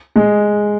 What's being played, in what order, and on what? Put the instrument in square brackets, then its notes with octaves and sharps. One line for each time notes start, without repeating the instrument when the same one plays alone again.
[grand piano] G#3